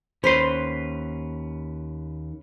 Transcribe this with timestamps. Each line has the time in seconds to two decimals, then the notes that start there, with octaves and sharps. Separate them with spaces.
0.24 D#2 C#4 B4 C5 C6